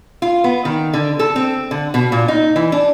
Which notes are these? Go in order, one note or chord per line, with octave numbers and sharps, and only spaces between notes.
F4
B3
D#3
D3
A4
C4
D3
B2
A#2
D#4
E3
D4